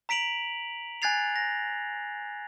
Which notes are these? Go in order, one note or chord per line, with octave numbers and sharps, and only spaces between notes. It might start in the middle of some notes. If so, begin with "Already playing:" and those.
A#5 B6 D7 F7 F#7
G#5 F#6 G#6 A6 C7 F7
A#6